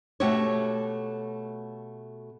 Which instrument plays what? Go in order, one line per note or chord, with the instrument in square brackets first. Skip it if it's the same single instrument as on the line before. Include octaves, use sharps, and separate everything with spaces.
[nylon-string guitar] B2 A3 F#4 G4 C#5